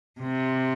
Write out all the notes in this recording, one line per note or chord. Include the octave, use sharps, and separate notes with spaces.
C3